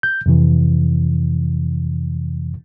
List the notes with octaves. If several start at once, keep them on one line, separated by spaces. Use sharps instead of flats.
G6
F2 C3 E3